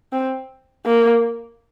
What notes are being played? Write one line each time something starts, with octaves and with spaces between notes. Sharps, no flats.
C4
A#3